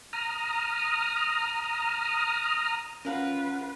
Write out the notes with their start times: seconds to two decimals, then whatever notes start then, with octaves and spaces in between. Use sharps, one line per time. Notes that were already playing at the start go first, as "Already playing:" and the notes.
0.13 A#5 D#6 F6
3.05 C#4 F4 A#4 B4 F5 F#5